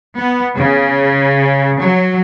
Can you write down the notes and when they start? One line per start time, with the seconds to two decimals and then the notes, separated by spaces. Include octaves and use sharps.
0.18 B3
0.57 C#3
1.81 F#3